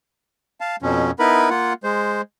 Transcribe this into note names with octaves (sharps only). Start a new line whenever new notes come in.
F5 A5
F2 B2 F3 C#4
B3 D#4 E4 A#4 B4 B5
A#3 F4 F#5
G#3 C5